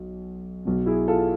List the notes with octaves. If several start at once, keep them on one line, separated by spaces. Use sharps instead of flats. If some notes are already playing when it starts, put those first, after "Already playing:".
Already playing: B1
B1 B2
E4 G#4
F4 A4